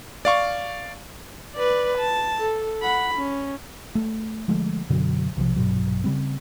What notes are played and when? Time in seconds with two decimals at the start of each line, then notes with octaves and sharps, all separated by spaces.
0.25 D5 F5 C#6
1.55 B4 D5
1.98 A5
2.39 A4
2.82 F#5 B5
3.15 C#4
3.95 A3
4.48 D3 F3 G#3 A3
4.90 F#2 B2 D3 F#3
5.37 B1 C3 D#3 F3
5.56 A#1 G2 B2 F#3
6.04 C#3 G3 C4